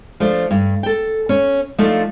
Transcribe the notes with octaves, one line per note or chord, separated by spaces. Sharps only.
F3 A3 D4
G2
A4 G5
C#4 C#5
F3 A3 D4 D#4 F4 A4